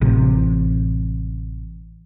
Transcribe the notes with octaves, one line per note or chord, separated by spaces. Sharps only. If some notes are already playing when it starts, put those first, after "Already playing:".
A1 C3